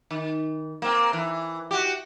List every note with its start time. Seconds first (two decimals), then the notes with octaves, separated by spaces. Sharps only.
0.11 D#3
0.82 A#3 C4
1.13 E3
1.71 F#4 G4